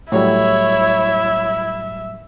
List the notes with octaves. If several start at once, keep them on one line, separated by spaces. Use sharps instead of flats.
A2 F#3 G3 E4 C#5 E5